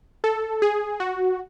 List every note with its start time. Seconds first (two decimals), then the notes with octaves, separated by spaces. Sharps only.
0.24 A4
0.62 G#4
1.00 F#4